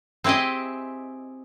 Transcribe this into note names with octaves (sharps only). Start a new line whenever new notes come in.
C4 E4 G4 G#4 D#5